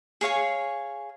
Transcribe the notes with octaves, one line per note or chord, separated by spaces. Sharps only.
G#4 C#5 F5 G#5